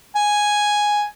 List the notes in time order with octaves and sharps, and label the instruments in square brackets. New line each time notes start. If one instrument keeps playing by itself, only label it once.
[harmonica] G#5